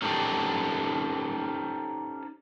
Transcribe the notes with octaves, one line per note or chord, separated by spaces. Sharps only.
C#4 D#4 G4 A4 C5 D5